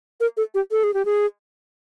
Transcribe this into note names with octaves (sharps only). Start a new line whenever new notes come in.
A#4
A4
G4
A4
G#4
G4
G#4